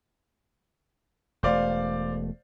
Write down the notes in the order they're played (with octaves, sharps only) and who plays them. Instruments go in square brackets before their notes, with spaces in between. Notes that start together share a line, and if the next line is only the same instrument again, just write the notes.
[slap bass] E1 A3 [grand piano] C5 D5 F5